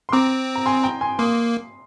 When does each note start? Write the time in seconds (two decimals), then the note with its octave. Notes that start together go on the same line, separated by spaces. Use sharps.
0.09 C6
0.12 C4 A#5 D6
0.56 A#5
0.66 G#5 C6
0.83 G5 A#5
1.01 G#5 C6
1.18 A#3 C6 D#6